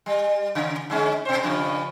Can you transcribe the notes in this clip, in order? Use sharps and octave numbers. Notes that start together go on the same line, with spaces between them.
G3
C#3
D3 G#3 C#4
B2 C5
G2 C#3 F3